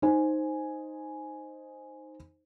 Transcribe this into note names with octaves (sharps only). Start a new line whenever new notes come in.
D#4 C5 G#5